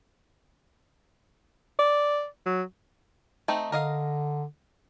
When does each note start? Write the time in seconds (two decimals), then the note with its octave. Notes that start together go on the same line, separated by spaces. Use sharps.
1.79 D5
2.46 F#3
3.48 A3 C4 D#4
3.72 D3 A#4 D#5 F5